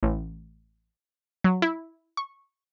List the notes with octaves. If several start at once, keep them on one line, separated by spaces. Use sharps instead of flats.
A1
F#3
E4
C#6